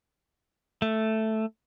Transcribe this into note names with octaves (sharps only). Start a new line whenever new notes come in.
A3